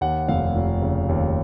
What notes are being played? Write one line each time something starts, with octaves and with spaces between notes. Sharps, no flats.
D#2 F#5
F1 F5
F1
C#3
D#2